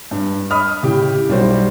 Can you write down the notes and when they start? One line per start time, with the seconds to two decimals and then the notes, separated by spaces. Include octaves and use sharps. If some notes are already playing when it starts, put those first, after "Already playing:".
0.11 G2
0.51 D#5 B5 D#6 F6
0.83 A2 C#3 E4 G4
1.29 B1 G3 E4 F#4 C5